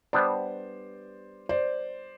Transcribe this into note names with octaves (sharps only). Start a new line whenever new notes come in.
G3 B3 D4 C5 D5
C5 D5